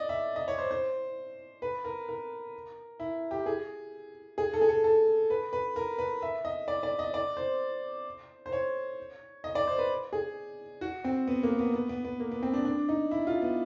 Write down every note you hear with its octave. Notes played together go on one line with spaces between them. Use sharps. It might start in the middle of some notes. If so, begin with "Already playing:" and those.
Already playing: D5 D#5
E5
D#5
C#5
C5
C5
B4
A#4
A#4
E4
G4
G#4
G#4
A4
G#4
A4
A4
B4
B4
A#4
B4
E5
D#5
D5
D5
D#5
D5
C5
C5
C#5
D#5
D5
C5
B4
G#4
F#4
C4
B3
A#3
B3
B3
B3
B3
A#3
B3
C4
D4
D4
D#4
E4
F4
B3